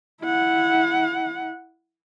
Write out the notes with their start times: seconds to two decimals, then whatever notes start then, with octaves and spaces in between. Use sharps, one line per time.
0.21 E4 F#5